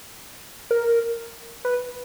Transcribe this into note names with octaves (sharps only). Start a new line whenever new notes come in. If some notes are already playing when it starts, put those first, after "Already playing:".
A#4
B4